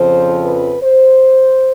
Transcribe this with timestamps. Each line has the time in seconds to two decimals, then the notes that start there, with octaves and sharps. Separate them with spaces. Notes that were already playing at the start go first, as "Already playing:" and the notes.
Already playing: F2 C#3 F3 C5
0.44 B4
0.83 C5